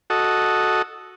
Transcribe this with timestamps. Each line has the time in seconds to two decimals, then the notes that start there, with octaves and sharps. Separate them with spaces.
0.10 F#4 A4 D#5